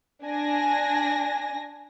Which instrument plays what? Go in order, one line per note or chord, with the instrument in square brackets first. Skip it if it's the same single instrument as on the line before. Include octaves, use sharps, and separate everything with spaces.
[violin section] D4 G#5 A#6